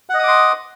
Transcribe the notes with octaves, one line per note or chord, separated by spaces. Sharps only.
D#5 F#5 C6 D6 D#6